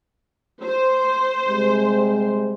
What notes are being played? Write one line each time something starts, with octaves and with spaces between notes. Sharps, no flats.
C5
C3 G3 G#3